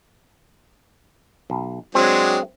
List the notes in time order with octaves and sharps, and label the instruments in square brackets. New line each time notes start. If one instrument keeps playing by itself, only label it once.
[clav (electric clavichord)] B1
[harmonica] F#3 G#3 D4 [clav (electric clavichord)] C4